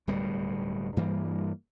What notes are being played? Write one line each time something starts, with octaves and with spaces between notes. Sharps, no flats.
D1 D#2 B2 G3
G2 E3 G3 A#3